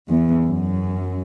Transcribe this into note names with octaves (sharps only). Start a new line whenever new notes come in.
E2
F#2